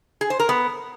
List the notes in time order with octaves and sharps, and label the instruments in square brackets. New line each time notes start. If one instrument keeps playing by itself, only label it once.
[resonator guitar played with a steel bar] G#4
C5
A#4
B3